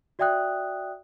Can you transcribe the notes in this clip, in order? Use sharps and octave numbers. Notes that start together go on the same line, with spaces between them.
F#4 D5 E5 G5 D#6 F#6